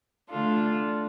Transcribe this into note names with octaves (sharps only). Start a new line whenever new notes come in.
D3 A3 D4 F4 A4